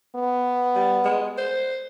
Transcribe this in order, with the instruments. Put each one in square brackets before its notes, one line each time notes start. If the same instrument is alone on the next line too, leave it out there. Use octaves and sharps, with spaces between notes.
[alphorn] B3
[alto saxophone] G3
G#3
C5